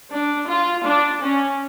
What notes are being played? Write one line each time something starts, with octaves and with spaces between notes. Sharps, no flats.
D4
F4
D4
C#4